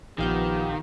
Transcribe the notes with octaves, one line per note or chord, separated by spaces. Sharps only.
A#1 D#3 F3 B3 G4 F5 G6